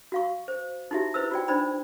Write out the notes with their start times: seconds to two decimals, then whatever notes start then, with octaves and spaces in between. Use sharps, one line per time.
0.12 F#4 F5 C#6
0.48 C5
0.91 D#4 E4 F#4 G4 E5
1.14 E4 B4 C5 E6
1.31 F4 F#4 D5 G5
1.48 D4 D#4 C5 D5 B5